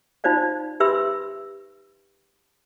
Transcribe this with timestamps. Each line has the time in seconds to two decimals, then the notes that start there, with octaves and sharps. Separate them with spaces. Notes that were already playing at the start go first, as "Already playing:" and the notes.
0.24 D#4 F4 C5 D5 F5
0.80 G4 B4 E5 B5 C6 E6